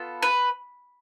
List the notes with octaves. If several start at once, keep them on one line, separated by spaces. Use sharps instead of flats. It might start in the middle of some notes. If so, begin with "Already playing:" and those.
Already playing: B3 F4 A4
B4